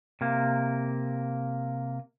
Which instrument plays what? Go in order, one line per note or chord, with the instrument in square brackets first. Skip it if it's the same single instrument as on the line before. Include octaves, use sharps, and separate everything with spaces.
[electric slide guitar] C3 A#3